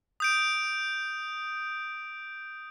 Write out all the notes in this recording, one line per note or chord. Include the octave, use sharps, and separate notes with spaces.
D#6 G6 D7